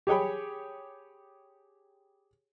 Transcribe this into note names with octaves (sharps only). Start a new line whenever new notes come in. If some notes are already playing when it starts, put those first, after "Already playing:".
G4 G#4 C#5 G5 B5